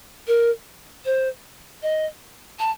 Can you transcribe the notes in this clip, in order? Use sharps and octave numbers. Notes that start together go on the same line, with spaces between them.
A#4
C5
D#5
A5